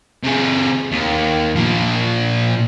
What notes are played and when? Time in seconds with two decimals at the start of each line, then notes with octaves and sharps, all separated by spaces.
0.24 C3 G#4
0.92 D#2
1.56 A#2 F3